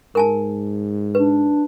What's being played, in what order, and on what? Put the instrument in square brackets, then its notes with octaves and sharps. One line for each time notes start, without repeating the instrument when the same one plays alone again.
[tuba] G#2 [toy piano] A#4 G#5 A5
[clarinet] D4 [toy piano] B4